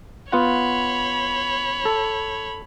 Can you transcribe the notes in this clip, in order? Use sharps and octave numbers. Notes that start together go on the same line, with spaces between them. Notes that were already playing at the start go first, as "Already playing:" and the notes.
B3 F4 C#5 F#5 B5
A4